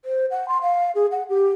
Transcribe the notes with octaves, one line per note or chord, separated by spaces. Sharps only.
C5
F#5
C6
F5
G#4
F#5
G4